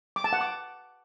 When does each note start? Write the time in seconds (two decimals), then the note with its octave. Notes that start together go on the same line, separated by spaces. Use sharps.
0.16 D6
0.24 A5
0.33 F#5
0.41 D6